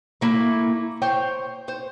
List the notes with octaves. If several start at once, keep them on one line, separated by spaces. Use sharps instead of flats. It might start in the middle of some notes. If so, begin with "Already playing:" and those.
A3 A#3 E4
C5 C#5 G5
C5